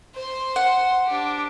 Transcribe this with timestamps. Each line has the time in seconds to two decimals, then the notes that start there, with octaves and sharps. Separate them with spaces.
0.15 C5 C6
0.56 F#5
1.07 D4 G4